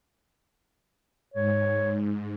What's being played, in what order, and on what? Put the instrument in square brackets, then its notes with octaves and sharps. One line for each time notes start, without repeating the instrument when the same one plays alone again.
[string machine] G#2 [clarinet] C#5